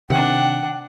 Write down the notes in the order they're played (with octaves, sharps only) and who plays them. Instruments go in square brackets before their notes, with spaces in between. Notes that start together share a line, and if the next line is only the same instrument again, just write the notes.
[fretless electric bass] C3 D#3 [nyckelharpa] D4 F#5 [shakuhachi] G5